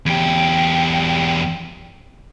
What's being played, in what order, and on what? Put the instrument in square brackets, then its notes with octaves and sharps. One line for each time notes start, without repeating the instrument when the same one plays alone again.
[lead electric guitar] E2 G4